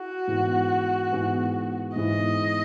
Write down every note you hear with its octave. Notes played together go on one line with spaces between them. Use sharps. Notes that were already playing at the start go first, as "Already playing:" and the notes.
Already playing: E4 F#4 G#4
G#2 E3 B3 E4 G#4
G#2 E3 B3 E4 G#4
G#2 E3 B3 E4 G#4 D#5